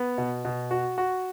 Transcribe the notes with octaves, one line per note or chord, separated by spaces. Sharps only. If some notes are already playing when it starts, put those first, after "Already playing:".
Already playing: B3
B2
B2
F#4
F#4